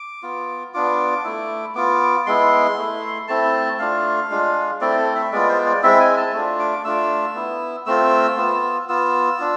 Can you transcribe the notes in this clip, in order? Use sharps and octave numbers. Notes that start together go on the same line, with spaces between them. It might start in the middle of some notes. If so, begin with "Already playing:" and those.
Already playing: D6
B3 F4
B3 D4 F4 D6
A3 E4
B3 F4 D6
G#3 B3 E4 C6
A3 E4
A3 C4 E4 A5
A3 D4 F4 F5
G#3 D4 F4
A3 C4 E4 D5
A4
E5
G#3 B3 F4 D5
C5
D5
G#3 C4 E4 E5
G#5
A5
A3 D4 F4
D6
A3 D4 F4 E6
B3 E4
A3 C4 F4 E6
B3 F4
B3 F4 E6
D4 F4